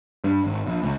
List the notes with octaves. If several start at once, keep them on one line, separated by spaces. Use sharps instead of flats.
G2
G#1
A#1
C#2